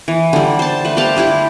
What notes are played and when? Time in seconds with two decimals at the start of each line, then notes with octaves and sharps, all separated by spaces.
0.08 E3
0.33 D3 G3
0.59 C5 A5
0.85 A3 B4
0.97 G4 C5 F5 A5
1.17 G3 D4 E4 G4